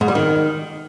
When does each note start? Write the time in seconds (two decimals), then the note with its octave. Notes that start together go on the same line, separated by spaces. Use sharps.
0.01 G#2
0.08 G3
0.15 D#3